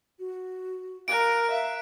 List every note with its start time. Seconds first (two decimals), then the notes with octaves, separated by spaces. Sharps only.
0.19 F#4
1.08 A#4 F5 F#6 D7
1.51 E5 F5